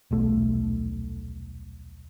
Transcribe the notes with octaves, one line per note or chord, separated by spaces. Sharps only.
D#1 B1 A3